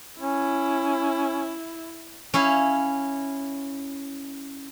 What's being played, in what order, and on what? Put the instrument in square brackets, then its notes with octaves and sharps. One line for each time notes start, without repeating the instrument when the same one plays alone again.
[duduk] C#4 [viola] E4
[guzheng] C#4 E4 F5